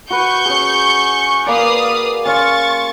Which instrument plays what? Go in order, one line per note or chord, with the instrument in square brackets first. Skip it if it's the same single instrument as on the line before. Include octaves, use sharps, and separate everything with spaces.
[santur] F#4 B4 [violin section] C#6 G6
[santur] C#4 G#4
[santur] A#3 D5 [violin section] B4 F5 D#6
[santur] C#4 F5 C6 [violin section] C#6 A6